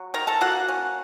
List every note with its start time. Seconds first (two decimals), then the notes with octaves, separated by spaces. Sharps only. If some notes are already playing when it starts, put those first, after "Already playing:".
Already playing: F#3
0.14 D#3 A#4 A#5
0.27 A4 A5
0.41 A#3 F#4 F#5
0.68 C#4